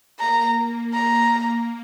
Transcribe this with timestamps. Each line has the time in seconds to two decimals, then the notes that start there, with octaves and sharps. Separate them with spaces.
0.20 A#3 A#5
0.94 A#5